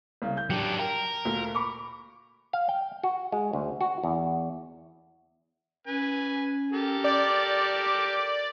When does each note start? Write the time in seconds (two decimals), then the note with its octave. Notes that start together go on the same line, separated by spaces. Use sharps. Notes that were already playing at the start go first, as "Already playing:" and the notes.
0.22 C2 C#3
0.37 G6
0.50 F#3 D4 G4
0.79 A#4 G5
1.25 D2 A#2
1.55 B5 C#6 D6
2.53 F5
2.69 G5
3.04 F#4
3.32 G#3
3.53 D2
3.81 F#4
4.04 E2
5.87 C#4 B4 G#5
6.72 G4 A4 A#4
7.04 D5 D6 G6